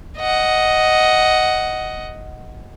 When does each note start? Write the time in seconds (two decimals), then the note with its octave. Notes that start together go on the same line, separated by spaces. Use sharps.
0.18 D#5 F#5